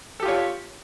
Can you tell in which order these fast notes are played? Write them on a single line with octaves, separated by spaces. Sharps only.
A4 G4 F4 C#5